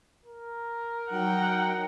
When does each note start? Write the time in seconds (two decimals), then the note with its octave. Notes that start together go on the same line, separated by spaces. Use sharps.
0.25 A#4
1.11 F#3 D#4 F#5 G5